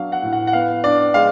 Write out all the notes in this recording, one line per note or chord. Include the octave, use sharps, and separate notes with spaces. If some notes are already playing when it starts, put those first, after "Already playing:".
Already playing: F#3 B3 D4 F5
F#5
A2
F#5
F#5
B3 F5
D4 D5
G#3 F5